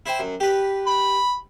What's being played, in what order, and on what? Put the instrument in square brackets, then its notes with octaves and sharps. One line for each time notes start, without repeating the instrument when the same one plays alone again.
[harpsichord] E4 C5 G5
F#2
G4 B4
[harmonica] B5